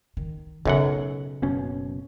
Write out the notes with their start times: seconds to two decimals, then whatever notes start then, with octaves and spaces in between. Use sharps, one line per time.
0.17 D#3
0.65 B1 F#2 C#3 F#5
1.42 F#1 B2 C#4